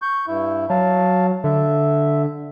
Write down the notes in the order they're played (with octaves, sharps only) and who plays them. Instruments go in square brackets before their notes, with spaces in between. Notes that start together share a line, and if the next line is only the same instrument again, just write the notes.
[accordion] C#6 G6
G2 E4
[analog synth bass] F#3 [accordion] F5 A5
[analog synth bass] D3 [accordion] E5